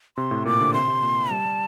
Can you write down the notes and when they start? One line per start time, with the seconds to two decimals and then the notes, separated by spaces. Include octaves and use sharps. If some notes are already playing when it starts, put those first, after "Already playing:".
0.17 C3 C6
0.31 A2
0.45 A#2 D6
0.61 D3
0.74 C3 C6
0.88 C3
1.02 A#2
1.30 G3 A5
1.45 G3